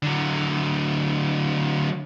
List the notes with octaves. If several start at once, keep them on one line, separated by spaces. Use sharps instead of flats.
D3 F#3